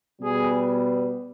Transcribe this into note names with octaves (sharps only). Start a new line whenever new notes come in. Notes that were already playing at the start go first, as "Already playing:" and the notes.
B2 G3 B3 G#4